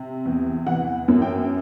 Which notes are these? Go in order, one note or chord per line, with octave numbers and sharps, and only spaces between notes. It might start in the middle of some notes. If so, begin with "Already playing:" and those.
Already playing: C3
E2
E3 F#5
F#2
G5